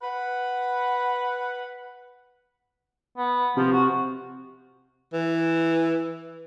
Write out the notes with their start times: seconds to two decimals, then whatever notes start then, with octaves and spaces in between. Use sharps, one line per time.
0.02 B4 F#5
3.18 B3
3.57 C3 F3
3.72 F#4
5.13 E3